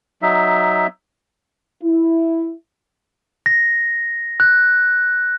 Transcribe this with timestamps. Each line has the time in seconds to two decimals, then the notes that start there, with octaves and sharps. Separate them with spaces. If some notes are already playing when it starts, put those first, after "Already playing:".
0.22 F#3 D#4 E5
1.83 E4
3.46 A#6
4.40 F#6